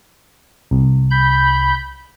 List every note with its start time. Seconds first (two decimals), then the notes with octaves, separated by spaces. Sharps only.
0.71 C2
1.11 B5 G6